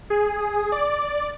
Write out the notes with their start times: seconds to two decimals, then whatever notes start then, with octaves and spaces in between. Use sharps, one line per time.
0.10 G#4
0.72 D5